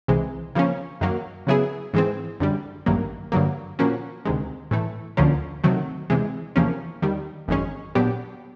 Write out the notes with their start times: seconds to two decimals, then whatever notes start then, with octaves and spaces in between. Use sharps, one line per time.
0.08 C2 C3 E3 G#3
0.55 C#3 F3 A#3 C#4
1.01 F#2 D#3 F#3 A#3
1.47 C#3 F#3 B3 E4 G#4
1.94 G#2 E3 G#3 C4
2.40 F#2 D3 G3
2.86 A1 G2 D#3 F#3 A#3
3.32 G2 D3 F#3 A#3
3.79 A#2 F3 A#3 C#4 F#4
4.25 D2 C3 D#3 G#3
4.71 A2 E3 A3
5.17 D2 D3 F3 A#3 C#4
5.64 C3 D#3 F#3 A3
6.10 E2 C3 E3 G#3
6.56 E2 C3 F3 A#3 C#4
7.02 D#2 D#3 G3
7.48 G#1 F#2 D#3 G#3 C#4
7.95 A#2 F#3 B3 D4 G4